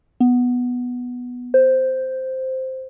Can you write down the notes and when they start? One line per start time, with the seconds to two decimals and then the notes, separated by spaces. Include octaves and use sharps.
0.21 B3
1.54 C5